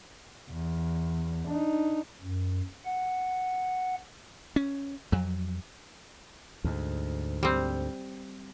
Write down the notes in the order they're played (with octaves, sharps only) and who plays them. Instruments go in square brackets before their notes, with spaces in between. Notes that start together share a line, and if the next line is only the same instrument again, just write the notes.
[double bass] E2
D4 D#4
[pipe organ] F#2
F#5
[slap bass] C#4
F2 F#3
D2 G#2
[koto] G3 C4